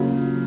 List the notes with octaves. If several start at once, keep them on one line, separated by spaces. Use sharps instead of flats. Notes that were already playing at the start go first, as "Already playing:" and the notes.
Already playing: C#3 F#3 A#3 F4